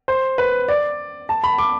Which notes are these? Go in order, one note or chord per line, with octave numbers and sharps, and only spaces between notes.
C5
B4
D5
A5
B5
D6